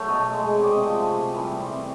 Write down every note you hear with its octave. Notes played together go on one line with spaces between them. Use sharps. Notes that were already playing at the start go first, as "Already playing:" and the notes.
Already playing: F#3 A3 C#5
B2 D#5
G#3
C3
D5
D#5
F3 A3
C3
E3 G3
C3